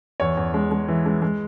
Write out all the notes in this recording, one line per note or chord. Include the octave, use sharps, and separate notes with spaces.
E2 C#5
E2
G#3
G#3
E3
G#3
G#3